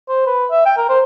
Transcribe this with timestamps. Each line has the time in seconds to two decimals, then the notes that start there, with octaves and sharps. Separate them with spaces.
0.09 C5
0.26 B4
0.51 E5
0.66 G5
0.77 A#4
0.89 C5